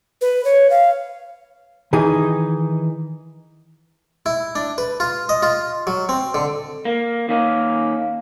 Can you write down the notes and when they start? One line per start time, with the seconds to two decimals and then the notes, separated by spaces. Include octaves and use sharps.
0.21 B4
0.45 C#5
0.70 F5
1.93 D#3 E3 D#4 G#4
4.26 E4
4.55 D4
4.78 B4
5.00 F4
5.29 D#5
5.43 F4
5.87 F#3
6.09 C4
6.34 D3
6.85 A#3
7.29 D#3 A#3 C#4 D#4